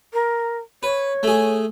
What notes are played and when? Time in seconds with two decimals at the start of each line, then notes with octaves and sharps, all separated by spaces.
0.13 A#4
0.83 B4 C#5
1.23 A3 G#4